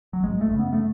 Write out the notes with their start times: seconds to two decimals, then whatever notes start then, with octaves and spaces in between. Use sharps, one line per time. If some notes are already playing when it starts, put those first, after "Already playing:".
0.13 F#3
0.23 G#1 G#3
0.41 A3
0.50 F#2 C#3
0.59 B3
0.73 A3